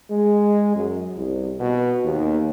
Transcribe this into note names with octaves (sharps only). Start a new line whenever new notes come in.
G#3
F#2
C2
B2
D#2